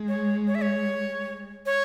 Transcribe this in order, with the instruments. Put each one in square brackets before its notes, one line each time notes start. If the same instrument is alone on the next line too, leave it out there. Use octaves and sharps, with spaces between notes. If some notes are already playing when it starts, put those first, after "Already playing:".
Already playing: [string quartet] G#3
[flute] C#5
C#5
E5
C#5
C#5